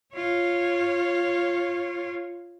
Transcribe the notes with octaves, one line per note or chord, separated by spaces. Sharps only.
F4 C#5